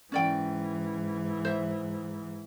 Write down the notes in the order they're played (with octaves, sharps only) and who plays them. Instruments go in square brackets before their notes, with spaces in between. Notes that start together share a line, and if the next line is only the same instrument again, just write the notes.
[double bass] G#2 E3 [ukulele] C#4 D5 G5
[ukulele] C5 E5